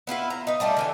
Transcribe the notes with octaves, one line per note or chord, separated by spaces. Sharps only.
B3 E4 F4 B4
A#5
D#4 B4
G3 A3 D4 F4
D3 E3 G#5